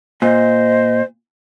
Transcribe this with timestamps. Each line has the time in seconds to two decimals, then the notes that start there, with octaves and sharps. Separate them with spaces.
0.22 A#2 C5 D#5